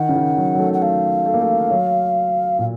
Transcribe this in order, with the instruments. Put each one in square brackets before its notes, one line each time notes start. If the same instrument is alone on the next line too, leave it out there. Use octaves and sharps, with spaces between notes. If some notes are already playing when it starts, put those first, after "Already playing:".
Already playing: [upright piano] D#3 [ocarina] F#5
[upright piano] C#3
D#3
F#3
F#3
A3
[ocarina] F#5
[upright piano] A3 [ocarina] F5
[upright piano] A3
A#3
A3
F#3
[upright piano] A#2 [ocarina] F5